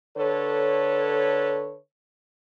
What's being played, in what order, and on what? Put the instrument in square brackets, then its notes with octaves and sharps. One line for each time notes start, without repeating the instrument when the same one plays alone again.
[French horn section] D3 A4 B4 C#5